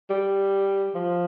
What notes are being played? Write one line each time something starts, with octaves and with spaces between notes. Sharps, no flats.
G3
F3